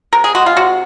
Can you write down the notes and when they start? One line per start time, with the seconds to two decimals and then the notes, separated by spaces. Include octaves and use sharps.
0.13 C3 A#4
0.24 G#4
0.35 G#3 F#4
0.46 F4
0.57 C3 F#4